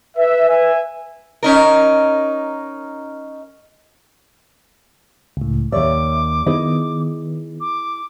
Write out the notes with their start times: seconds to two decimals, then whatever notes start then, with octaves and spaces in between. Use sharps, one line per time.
0.17 B4 E5
0.49 E5 G#5
1.43 C#4 D#4 A#4
5.37 C#2 A2
5.72 D#2 C#5 D5 E5 D6
6.47 D#3 B3 E4 G#4 D#5
7.61 D6